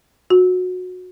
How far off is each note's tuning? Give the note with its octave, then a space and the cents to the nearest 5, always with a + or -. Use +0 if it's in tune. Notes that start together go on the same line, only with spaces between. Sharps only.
F#4 -20